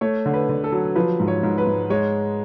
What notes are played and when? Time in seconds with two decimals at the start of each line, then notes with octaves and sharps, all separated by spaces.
0.01 A3 C#5
0.26 D3
0.34 B4
0.49 D3
0.64 A4
0.72 F#3
0.95 F3 B4
1.20 G#2
1.28 C#5
1.43 G#2
1.58 B4
1.67 G#2
1.90 G#3 C#5